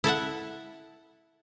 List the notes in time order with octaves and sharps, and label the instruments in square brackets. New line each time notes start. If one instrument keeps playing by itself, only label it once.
[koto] E4 A4 E5 F#5